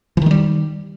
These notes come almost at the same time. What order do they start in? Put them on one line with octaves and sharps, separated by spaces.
E3 D#3 G#3 G3